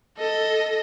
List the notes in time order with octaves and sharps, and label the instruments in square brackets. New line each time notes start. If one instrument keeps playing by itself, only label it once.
[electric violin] A4 D#5